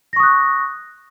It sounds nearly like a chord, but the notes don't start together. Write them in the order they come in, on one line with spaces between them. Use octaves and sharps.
A#6 C#6 D#6 F#6